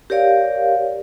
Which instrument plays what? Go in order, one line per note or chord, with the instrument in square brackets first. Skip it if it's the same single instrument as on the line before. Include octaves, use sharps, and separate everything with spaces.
[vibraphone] G4 A#4 C#5 D5 F5